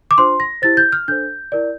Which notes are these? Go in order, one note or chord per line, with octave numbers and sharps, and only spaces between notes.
D6
D4 F4 C5 C6
A#6
E4 G4 C5 A6
G6
F6
D4 A4 C5 G6
E4 A#4 D5